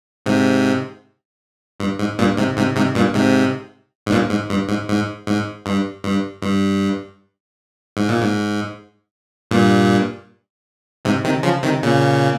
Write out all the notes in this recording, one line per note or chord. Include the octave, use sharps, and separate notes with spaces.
G#2 C3
G2
G#2
G2 A#2
G#2 C3
G#2 C3
G#2 C3
G2 A#2
G#2 C3
G#2
G2 A#2
G#2
G2
G#2
G#2
G#2
G2
G2
G2
G#2
A#2
G#2
G2 A#2
G#2 C3
C3 D#3
C#3 F3
C3 D#3
A#2 C#3